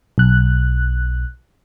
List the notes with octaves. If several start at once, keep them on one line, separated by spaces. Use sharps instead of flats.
B1 F#6